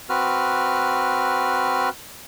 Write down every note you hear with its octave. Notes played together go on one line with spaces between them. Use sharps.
C4 F#4 B4 F6